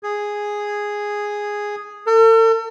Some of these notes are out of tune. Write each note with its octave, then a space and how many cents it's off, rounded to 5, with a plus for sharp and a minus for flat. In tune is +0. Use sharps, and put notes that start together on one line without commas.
G#4 -5
A4 +45